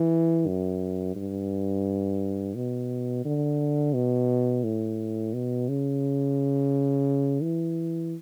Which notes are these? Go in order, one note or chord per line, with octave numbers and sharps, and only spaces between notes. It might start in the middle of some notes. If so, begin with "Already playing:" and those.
Already playing: E3
F#2
G2
B2
D3
B2
A2
B2
C#3
E3